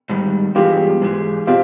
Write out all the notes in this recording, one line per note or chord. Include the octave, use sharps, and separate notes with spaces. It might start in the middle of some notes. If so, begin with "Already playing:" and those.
G#2 D#3 G3
G2 E3 G#3 B3 F4 G4
G#2 E3 G#3
B2 C4 F4 G4